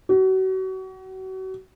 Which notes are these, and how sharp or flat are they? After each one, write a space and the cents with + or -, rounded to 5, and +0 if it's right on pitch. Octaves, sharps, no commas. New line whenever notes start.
F#4 +35